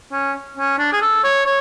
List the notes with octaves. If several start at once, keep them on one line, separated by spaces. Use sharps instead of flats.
C#4
C#4
D4
G#4
A4
C#5
C#5